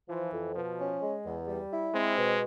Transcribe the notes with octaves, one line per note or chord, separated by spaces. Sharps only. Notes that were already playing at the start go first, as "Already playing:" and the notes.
E3 F3
F2
B2 F3
C#4
G#3
E2
G3
E4
G#3 C4
B2